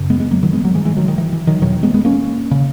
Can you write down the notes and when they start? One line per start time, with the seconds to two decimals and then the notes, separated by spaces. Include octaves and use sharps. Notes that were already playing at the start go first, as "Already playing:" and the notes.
Already playing: F#2 C#3
0.10 G#3 B3
0.20 G#3 B3
0.31 F#3 A#3
0.43 D#3 F#3
0.53 G#3 B3
0.65 F#3 A#3
0.74 G#2 E3 G#3
0.85 E3 G#3
0.97 D#3 F#3
1.08 D#3
1.18 E3
1.33 E3
1.47 D#3 F#3
1.62 E2 B2 D#3 F#3
1.83 G#3 B3
1.94 G#3 B3
2.05 A#3 C#4
2.51 C#3